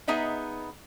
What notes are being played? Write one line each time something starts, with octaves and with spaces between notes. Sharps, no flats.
B3 D#4 G#4 D#5 E5 A#5